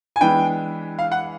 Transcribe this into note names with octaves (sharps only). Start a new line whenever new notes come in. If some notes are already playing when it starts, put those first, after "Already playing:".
G#5
E3 G#3 B3 D4 G5
F5
F#5